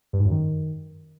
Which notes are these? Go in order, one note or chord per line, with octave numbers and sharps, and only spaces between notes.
G2
G#2
F#2
D#3